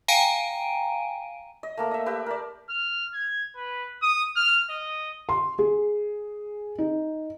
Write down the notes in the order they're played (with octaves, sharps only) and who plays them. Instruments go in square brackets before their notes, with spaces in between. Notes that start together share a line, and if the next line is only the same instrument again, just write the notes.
[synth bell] F5 G5 G#5 A#5 D7 D#7
[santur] D#5
A3 A#3 A4
D#5 E5
G4 B4 E5
A#4 D5
[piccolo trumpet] F6
G#6
B4
D#6
F6
D#5
[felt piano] C6
G#4
D#4